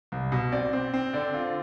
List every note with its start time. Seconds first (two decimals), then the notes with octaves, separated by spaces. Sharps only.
0.12 C2
0.32 B2
0.52 C4 D5
0.73 C4
0.93 C4
1.13 D3 D5
1.34 F4